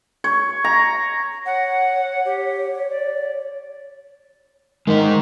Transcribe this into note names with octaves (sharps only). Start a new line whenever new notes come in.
C#5
A#5
C#5 F#5
G4
D5
D#3 G#3 D#4 D#5